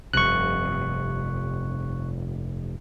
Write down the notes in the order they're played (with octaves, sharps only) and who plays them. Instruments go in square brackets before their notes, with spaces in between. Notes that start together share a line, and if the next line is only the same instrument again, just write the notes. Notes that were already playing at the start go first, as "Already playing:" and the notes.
[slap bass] F1 G2 C3 [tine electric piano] C#6 F#6